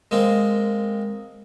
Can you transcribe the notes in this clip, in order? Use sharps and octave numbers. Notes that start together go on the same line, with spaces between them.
G#3 A#3 C4